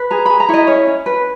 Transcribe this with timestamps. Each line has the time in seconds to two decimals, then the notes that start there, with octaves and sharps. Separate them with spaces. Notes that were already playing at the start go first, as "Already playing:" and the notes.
Already playing: B4
0.11 G#4 A#5
0.26 G#4 B5
0.40 A#5
0.49 E4 C#5
0.53 D#5
0.67 C#4 C#5
0.87 C#4
1.06 B4